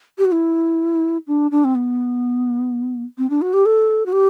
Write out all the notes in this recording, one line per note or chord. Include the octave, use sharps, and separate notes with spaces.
G4
F#4
E4
D4
D4
C4
B3
C4
D4
F#4
G4
A4
F#4
G4